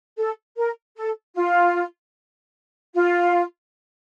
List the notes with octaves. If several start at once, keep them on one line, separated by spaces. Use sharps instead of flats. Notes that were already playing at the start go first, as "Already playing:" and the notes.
A4
A#4
A4
F4
F4